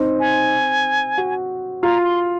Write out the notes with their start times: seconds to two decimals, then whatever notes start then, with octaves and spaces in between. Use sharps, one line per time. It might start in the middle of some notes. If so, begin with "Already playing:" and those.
Already playing: C4 D#4
0.20 G#5
1.17 F#4
1.83 F4 A#5
2.04 C6